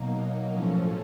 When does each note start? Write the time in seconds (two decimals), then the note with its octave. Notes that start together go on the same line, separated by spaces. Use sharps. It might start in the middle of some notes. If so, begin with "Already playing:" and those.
Already playing: B2 F#3 A#3 D#4
0.52 A2 F3 A3 C#4